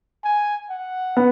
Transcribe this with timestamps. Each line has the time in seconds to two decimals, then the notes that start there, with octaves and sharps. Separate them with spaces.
0.24 G#5
0.70 F#5
1.17 B3